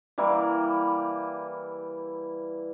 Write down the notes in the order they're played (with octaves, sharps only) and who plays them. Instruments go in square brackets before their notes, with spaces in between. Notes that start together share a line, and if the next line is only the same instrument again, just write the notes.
[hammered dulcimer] E3 G3 A#3 E4